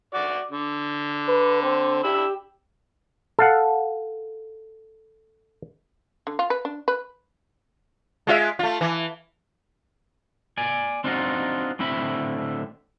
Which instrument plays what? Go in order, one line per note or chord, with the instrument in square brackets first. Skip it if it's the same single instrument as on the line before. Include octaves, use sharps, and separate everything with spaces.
[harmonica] F#4 D5 D6
D3
[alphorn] B4
C4
[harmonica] D4 B5 E6 [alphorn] G4
[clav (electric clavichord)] A4 F5 F#5
[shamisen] D3
F4
B4
D4
B4
[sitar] G#3 F4 E5
A3 F4
E3
[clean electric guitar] D5 G#5
C4 D4 D#4 F4 F#4
A2 D3 C4 E5 B5